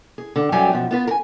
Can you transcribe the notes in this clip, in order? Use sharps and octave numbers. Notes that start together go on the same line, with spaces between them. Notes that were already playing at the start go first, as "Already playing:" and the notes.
G#4
D3
F#2 F#3 G3 G4 G5 G#5
F#2 B2 F3
B3 F4 B4
A#4 G#5